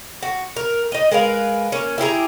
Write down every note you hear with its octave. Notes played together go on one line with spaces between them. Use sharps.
F#4
A#4
D#4 D#5
G#3 A#4 B4 F5
A#3 C#4
E4 G4 G#4 A#5